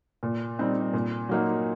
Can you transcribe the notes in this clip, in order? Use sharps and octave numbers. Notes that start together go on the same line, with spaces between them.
A#2
G3 C4 D#4
A#2
F#3 A#3 D#4